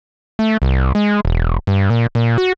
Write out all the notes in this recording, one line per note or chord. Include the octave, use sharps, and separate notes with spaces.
A3
C2
G#3
E1
G2
A#2
A#2
F#4